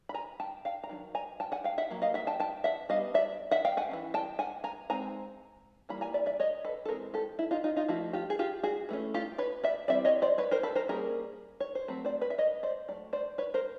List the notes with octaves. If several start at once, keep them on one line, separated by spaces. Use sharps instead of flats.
B5
G#5 A#5
G5 A5
F5 G5
A#5
D#3 F#3 D4
G#5 A#5
G5 A5
F#5 G#5
F5 G5
E5 F#5
F#3 A#3
D#5 F5
E5 F#5
G5 A5
G5 A5
E5 F#5
G3 B3 D4 D#5 F5
D5 E5
E5 F#5
F5 G5
F#5 G#5
E3 A3 C#4
G5 A5
F#5 G#5
G#5 A#5
G#3 C4 D#4 G#5 A#5
E3 G3 A#3 B5
G#5 A#5
D5 E5
D5 E5
C#5 D#5
A4 B4
A4
E3 G#3 C4 G#4 A#4
G4 A4
E4
D#4 F4
D#4 F4
D#4 F4
F3 A3 D4 E4 F#4
F4 G4
G#4
F4 G4
F#4 G#4
E3 A3 C#4
F4 G4
B4 C#5
D5 E5
E3 G3 C4 D5 E5
C#5 D#5
C5 D5
B4 C#5
A#4 C5
A4 B4
A#4 C5
G3 A#3 C#4 G#4 A#4
C#5
C5
F#3 A3 C4 B4
C5 D5
B4 C#5
E5
C#5 D#5
C5 D5
F#3 A3 D5
C5 D5
B4 C#5
A#4 C5